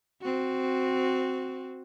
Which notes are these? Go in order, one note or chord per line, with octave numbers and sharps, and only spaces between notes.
C4 F#4